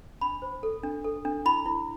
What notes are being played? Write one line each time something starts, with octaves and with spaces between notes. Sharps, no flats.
D4 B5
C5
A4
D4
A4
D4
E4 B5
E4